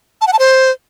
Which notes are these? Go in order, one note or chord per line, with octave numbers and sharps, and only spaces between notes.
A5
F#5
A5
C5